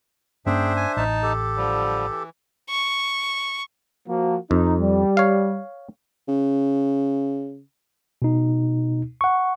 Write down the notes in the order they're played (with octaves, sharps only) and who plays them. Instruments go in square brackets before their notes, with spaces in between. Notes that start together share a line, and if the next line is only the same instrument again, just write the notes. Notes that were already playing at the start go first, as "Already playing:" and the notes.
[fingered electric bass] G2 A#3 C#4 [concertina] D4 C5 E5 [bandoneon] G#4 G5
[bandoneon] G#5
[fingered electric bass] A1 [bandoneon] D#4 A5
[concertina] G4 A4
[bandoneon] D3 F3 G3
E3
[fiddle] C#6
[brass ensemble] F3 A#3 F#4
[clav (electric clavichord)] F2 [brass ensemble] D#4
[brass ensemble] G3
[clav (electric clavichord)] C#5 F5
[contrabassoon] C#3
[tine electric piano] B2 D#4
F#5 C#6